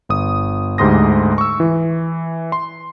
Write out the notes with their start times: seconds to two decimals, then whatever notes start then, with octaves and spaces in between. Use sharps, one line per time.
0.09 G1 D#6
0.78 D2 G#2 G4 C6 D#6 A#6
1.38 C#6 E6
1.60 E3
2.52 C6